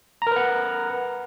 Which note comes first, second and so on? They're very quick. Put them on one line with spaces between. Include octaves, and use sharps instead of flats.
A#5 A#4 B4 F#5